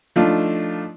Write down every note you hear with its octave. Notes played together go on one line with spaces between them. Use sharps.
F3 A3 D4 D#4 F4